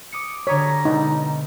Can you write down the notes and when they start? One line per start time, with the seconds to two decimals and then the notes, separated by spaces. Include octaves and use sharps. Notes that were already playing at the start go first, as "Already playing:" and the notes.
0.12 D6 D#6 C#7
0.47 D3 G3 C#5 A#5 D#6 B6
0.85 B2 D3 D#4